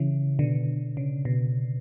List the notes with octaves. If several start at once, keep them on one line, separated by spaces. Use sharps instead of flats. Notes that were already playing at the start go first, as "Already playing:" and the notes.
Already playing: C#3 E3
B2 D3
C#3
B2